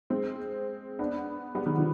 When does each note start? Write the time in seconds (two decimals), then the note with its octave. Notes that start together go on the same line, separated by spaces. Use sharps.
0.10 G#3 C4
0.99 B3 D4
1.55 G3 B3
1.66 D#3 G3
1.77 D3 F3